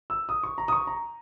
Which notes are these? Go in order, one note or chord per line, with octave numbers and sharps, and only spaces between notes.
E6
D#6
C#6
A#5
D#6
C#6
A#5